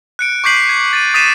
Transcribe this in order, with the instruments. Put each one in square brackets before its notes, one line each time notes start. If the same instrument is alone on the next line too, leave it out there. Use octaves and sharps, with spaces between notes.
[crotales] F#6 C#7 D7
C#6 D6 G6 B6 C7 F#7
G#6
A6 D#7
D#6 A6 B6 C7 D#7 E7